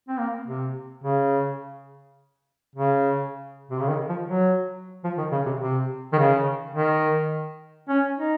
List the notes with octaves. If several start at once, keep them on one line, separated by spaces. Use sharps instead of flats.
C4
A#3
C3
C#3
C#3
C3
C#3
D#3
F3
F#3
F3
D#3
C#3
C3
C3
D#3
C#3
D#3
C#4
D#4